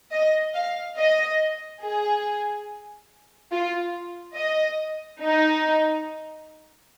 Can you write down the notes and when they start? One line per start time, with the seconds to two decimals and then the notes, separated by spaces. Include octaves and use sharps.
0.12 D#5
0.54 F5
0.98 D#5
1.82 G#4
3.52 F4
4.36 D#5
5.21 D#4